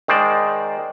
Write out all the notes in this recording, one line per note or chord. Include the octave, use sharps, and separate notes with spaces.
D#3 G#3 C5 D5